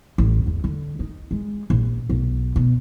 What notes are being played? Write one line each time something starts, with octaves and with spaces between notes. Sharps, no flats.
A1
E2
D3
D#4
G#3
A#1
B1
B2